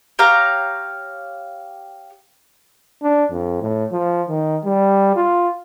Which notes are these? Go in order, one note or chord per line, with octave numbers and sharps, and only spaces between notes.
G4 C#5 F5 A#5
D4
F2
A2
F3
D#3
G3
F4